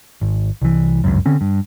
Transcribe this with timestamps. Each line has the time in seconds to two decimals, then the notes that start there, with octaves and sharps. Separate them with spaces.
0.21 G#1
0.62 C2 E3
1.04 G1 C#2 F#2
1.26 D3 C4 C#4
1.41 G2